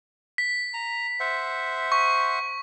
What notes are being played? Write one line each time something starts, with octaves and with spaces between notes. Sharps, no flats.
B6
A#5
C5 E5 F#5
C#6